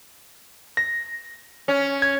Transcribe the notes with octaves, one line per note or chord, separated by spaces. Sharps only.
A#6
C#4
G#6